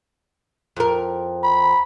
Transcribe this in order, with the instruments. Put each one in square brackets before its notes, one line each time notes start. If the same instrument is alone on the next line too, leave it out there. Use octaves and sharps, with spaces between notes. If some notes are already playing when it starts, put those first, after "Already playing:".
[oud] F2 A#4
[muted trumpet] B5